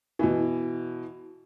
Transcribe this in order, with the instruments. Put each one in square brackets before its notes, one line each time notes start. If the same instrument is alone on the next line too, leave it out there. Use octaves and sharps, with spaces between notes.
[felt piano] B2 E3